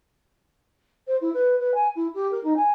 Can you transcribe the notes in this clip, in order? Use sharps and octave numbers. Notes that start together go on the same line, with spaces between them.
C5
E4
B4
B4
G#5
E4
G4
A#4
D#4
G#5